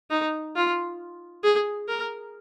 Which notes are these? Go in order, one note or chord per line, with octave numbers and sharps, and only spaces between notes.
D#4
F4
G#4
A#4